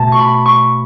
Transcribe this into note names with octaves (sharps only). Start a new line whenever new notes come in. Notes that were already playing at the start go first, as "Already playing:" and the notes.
Already playing: B2 A3 A5
C#6
B5
C#6